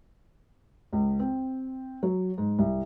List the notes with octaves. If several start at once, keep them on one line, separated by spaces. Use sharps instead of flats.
C#2
C4
F#3
G#2
C2